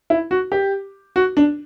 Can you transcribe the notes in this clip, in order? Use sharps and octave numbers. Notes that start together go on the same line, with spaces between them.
E4
F#4
G4
F#4
D4